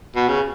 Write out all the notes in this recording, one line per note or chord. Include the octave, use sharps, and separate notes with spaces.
B2
C#3